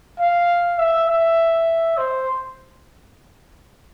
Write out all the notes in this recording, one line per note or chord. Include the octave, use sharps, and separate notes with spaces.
F5
E5
E5
C5